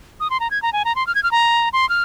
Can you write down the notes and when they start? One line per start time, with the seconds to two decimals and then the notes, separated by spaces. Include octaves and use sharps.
0.20 D#6
0.30 C6
0.40 A#5
0.51 G#6
0.62 A#5
0.73 G#5
0.85 A#5
0.96 C6
1.07 F6
1.15 G#6
1.23 F6
1.32 A#5
1.73 C6
1.89 F6